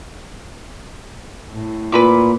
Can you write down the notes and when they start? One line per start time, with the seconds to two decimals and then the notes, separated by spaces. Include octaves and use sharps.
1.51 A2
1.92 A#2 B4 B5 D6